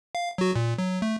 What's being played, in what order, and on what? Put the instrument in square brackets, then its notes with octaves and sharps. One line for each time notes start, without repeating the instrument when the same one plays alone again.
[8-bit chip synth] F5
F#3 F#4
A#2
F#3
A3